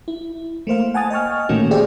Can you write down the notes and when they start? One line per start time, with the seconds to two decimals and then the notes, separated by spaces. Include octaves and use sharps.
0.08 E4
0.67 A3 A#3 C5 F5
0.94 F#5 G#5 A5 D#6 A6
1.10 D#5 G5 G#5 C#6 F6
1.49 A#2 D#3 A3 A#3 C#4 F#4
1.71 G4 G#4 C5 D5 E5 G5